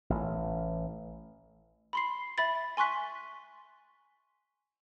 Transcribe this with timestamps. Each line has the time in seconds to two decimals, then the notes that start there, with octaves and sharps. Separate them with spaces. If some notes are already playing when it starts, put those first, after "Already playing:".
0.10 A1
1.93 B5 C6 C7
2.38 E5 B5 A6
2.77 G#5 C6 C#6 F#6 B6